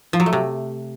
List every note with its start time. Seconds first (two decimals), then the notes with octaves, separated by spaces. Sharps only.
0.13 F3
0.20 F#3
0.26 A3
0.33 C3